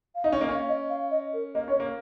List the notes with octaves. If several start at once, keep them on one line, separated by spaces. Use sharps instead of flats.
F5
D#4 D#5
C#4
A#3 D#5
C#4 F5
D#5
F5
D#5
A#4
A#3 D#5
C#4 C#5
A#3